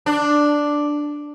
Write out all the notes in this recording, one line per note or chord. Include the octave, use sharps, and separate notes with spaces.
D4